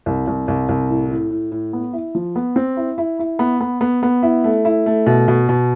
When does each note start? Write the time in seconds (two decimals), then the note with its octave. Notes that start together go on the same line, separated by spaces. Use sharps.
0.06 C2
0.27 C2
0.48 C2
0.69 C2
0.89 A2
1.11 A2
1.31 A2
1.52 A2
1.73 B3
1.93 E4
2.15 F3
2.36 B3
2.56 C4
2.77 E4
2.98 E4
3.19 E4
3.39 B3
3.61 B3
3.81 B3
4.03 B3
4.23 E4
4.44 A3
4.65 E4
4.86 A3
5.06 B2
5.28 B2
5.49 B2